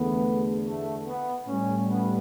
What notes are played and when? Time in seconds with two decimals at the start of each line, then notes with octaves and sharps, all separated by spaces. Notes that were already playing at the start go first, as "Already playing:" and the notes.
Already playing: E2 D3 A3 B3
0.67 A3
1.07 B3
1.47 A2 G3 C#4
1.89 B3